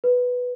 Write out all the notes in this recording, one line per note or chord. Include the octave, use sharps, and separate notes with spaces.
B4